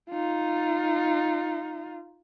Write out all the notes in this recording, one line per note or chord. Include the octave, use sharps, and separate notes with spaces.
D#4 F4